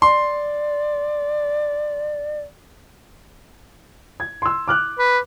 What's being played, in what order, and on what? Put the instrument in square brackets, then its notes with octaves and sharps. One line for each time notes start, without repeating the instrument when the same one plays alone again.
[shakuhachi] D5 [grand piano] C6
[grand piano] G#6
C6 E6
D6 F6 F#6
[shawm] B4